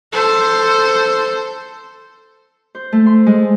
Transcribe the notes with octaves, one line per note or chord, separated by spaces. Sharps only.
A4 C5
C5
A3
C6
G#3